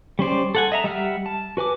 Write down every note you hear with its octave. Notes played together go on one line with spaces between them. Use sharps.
G3 C#4 C5 D5
A4 F#5 G#5
D#5 E5 A#5
G3 E5 F#5 F6
A5
F#4 B4 G#5 D6